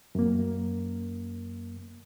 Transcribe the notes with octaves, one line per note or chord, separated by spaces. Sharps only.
F#2 A#3